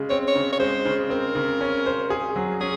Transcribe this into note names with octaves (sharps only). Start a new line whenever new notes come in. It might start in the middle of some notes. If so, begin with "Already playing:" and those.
Already playing: C#3 G#3
C4 C#5
C#5
C#3
C#5
G#3 C5
C#3
C4 A#4
C#3
C#4
C5
G#4
F#3
C#4 G#4